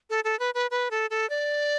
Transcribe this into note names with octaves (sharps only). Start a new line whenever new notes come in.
A4
A4
B4
B4
B4
A4
A4
D5